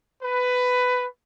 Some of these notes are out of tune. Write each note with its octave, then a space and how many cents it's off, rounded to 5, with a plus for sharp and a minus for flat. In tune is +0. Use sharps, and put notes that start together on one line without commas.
B4 +15